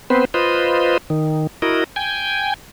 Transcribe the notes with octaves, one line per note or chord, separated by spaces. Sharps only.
B3 C4 B4 C5
F4 B4 C5 D#5
D#3
E4 F#4 A#4 D#5
G5 G#5